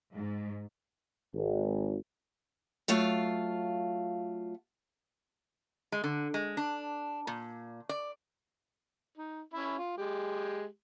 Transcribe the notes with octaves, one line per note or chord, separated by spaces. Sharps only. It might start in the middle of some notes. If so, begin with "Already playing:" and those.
G#2
G#1
F#3 A3 F4 F5
G#3
D3
G#3
D4
A#2
D5
D#4
C#4 E4
F4
G#3 G4